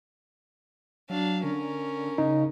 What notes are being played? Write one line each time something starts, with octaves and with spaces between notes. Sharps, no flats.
F#3 D4 F5
D3 C#4 A#4
C#3 D#4